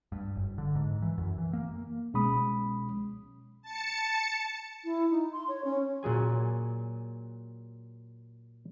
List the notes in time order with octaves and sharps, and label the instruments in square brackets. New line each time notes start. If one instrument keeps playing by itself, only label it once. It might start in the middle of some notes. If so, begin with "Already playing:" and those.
[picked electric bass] G2
F#1
D3
G#2
E3
F#2
E3
A#3
[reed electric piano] C2 B2 G#3 C#4 B5 D#6
[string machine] A5 C#7
[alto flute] E4
D#4
C6
C#5
C#4
[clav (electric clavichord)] A#2 F#3 G#4 G#5